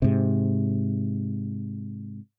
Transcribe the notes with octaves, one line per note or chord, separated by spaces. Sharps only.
G#2 C3